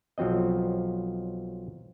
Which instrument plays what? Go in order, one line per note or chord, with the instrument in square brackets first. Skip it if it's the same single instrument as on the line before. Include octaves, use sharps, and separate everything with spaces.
[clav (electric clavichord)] B1 F3 F#3 C4 D#5